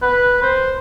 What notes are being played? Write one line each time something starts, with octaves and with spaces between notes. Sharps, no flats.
B4
C5